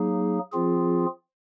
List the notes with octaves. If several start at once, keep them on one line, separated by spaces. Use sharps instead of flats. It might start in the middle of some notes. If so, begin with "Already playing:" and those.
Already playing: F#3 A#3 D#4 G#4
F3 C4 F4 G#4